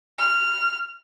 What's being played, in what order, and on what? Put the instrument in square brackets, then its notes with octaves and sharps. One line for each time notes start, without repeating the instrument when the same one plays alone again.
[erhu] F6